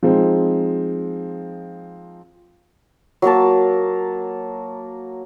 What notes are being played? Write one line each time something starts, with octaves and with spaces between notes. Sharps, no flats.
F3 G#3 C4 D#4
F#3 A#3 A#4 A5